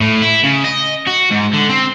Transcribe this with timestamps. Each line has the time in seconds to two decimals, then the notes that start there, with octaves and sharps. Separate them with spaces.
0.01 A2
0.22 E4
0.43 C#3
0.64 D#5
1.07 F#4
1.31 G#2
1.54 D3
1.69 C4